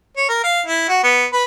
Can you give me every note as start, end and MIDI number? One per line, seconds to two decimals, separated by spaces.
0.17 0.27 73
0.29 0.40 70
0.44 0.61 77
0.66 0.88 64
0.88 1.02 66
1.04 1.25 59
1.33 1.44 71